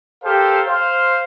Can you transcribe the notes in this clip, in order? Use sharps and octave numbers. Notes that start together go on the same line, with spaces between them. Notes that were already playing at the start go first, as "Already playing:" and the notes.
G4 A4 A#4 C5 F5
C5 F5